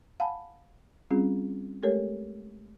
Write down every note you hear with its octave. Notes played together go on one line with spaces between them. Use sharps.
F5 F#5 G#5 A5 B5
G3 C4 C#4 F4 G#4
G#3 A3 G4 A4 A#4 C#5